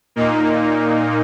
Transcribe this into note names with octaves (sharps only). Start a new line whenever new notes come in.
A#2 A#3 D#4